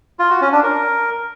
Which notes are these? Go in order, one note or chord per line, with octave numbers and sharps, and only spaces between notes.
F4
F#4
C#4
D4
A#4